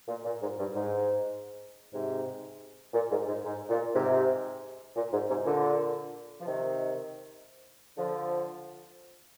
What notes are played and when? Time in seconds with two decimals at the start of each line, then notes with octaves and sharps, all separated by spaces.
0.08 A#2
0.25 A#2
0.41 G#2
0.59 G2
0.75 G#2
1.92 G#2 C3
2.94 A#2
3.11 G#2
3.27 G#2
3.44 G#2
3.69 A#2
3.95 G#2 C3
4.96 A#2
5.12 G#2
5.29 G#2 C3
5.45 A#2 D3
6.41 F3
6.46 C3 D#3
7.98 D3 F3